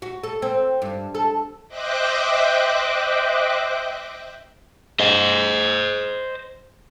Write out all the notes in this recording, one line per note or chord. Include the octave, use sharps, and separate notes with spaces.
F#4
A4
C4
G2
A4
C5 D#5 E5 G5 D6 F#6
C5 D#5